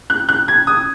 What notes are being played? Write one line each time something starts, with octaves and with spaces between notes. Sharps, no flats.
F#6
F#6
G#6
D#6